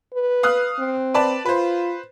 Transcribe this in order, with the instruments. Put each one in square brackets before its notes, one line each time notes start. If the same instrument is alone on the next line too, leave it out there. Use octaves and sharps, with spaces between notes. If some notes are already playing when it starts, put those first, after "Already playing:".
[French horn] B4
[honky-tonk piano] F5 D#6 F#6
[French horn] C4
[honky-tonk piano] B4 D5 A5
[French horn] F4 [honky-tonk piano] B4 C5